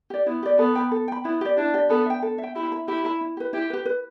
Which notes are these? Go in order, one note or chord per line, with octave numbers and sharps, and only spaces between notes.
G4 D5
B3 E4
G4 D5
B3 A4
G5 B5
A4
G5 B5
B3 E4
G4 D5
D4 E4
G4 D5
B3 A4
E5 G5
A4
E5
G5
E4 G4
E5 B5
E4 G4
E5 B5
E4
G4 B4
E4 G4
G4 B4
B4